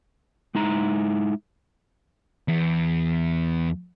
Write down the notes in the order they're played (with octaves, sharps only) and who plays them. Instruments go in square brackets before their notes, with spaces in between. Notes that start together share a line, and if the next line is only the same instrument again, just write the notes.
[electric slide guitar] G#3 D#4 E4 A#5
[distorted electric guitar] E2 E3